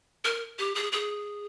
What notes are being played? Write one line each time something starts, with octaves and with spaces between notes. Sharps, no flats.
A#4
G4
G#4
G#4